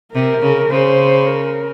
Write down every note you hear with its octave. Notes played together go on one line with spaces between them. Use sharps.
C3 A#4
C#3
C#3 C5
A#4